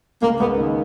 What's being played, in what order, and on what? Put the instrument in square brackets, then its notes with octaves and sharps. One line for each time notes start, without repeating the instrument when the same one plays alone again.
[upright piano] C#2 [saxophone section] A#3
[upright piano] C#2 [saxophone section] B3
[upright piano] D#3